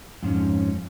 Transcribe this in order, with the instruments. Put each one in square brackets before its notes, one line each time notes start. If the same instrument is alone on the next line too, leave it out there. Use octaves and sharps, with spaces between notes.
[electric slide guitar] F2 G#2 C#4